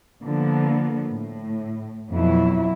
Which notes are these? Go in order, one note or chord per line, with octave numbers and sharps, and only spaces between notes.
D3 F3 A#3 B3
A2
F2 B2 F#3 E4